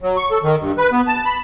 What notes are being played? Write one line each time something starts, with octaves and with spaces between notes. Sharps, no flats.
F#3
C#6
A4
D#3
G2
B4
B3
A5
B5